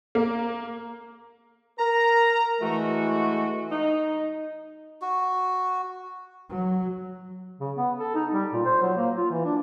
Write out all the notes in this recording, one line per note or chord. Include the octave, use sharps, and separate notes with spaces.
A#3
A#4 A#5
E3 G#3 A3 F#4
D#4
F#4
F#3
C#3
B3
A4
D#4
G3
A#2
C5
F#3
A#3
F4
E3
D4